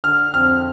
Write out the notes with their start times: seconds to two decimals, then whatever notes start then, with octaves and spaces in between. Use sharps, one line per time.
0.04 D3 F6
0.34 F2 F6